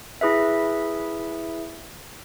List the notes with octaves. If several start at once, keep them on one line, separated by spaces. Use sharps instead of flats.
E4 G#4 B4 E5